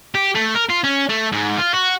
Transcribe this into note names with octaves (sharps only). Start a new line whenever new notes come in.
G4
A3
A#4
F4
C#4
A3
G#2
F4
F#4